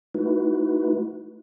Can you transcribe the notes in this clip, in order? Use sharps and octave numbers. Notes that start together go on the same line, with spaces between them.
A3 D#4 E4 F#4 B4